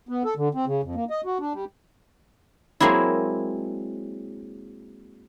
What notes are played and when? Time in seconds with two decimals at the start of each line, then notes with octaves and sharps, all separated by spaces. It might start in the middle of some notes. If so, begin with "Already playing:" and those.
0.09 B3
0.25 A4
0.37 D3
0.54 C4
0.66 C#3
0.83 F2
0.95 A#3
1.10 D#5
1.25 F#4
1.40 D4
1.53 G3
2.80 F#3 G#3 A#3 C4 E4